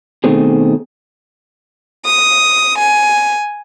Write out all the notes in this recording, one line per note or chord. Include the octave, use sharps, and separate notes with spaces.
B2 D#3 A3 C4 G#4
D#6
G#5